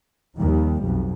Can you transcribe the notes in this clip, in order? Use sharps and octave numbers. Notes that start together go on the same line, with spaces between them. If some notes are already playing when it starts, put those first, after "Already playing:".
D#2 D#3 F3 G3
B1 F2